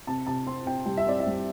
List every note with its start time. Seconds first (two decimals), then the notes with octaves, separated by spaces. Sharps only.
0.07 C3 A5
0.26 C3 A5
0.47 C4 C6
0.66 C3 G5
0.86 G3 G5
0.97 E5
1.06 C4 D5
1.20 E5
1.27 G3